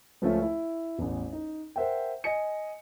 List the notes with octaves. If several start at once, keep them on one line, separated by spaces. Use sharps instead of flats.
C#2 F3 A3 C#4 E5
E4
A1 E2
D#4
A#4 C5 E5 F#5 G5
D#5 G#5 C#7